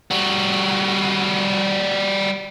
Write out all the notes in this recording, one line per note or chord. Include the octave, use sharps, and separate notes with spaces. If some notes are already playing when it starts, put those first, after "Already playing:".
G3 F#4